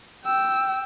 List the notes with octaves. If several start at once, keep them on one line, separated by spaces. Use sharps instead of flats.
G5 E6